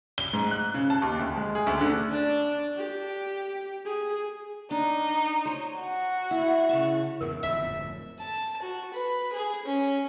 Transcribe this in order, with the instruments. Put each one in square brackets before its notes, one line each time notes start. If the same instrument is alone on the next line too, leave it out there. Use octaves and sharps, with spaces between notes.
[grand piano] G7
G#2
F#6
C#3
A5
D#2
D2
G#3
G#4
D2
D3
[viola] D4
G4
G#4
[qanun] D4 [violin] D#4
[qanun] C5 C#5
[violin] F#4
[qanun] E4
C#3 A5 C#6
[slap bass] E2 G#2 C#3 [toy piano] A#4
[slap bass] D1 F2 G#2 [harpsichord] E5
[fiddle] A5
F#4
B4
G#4
C#4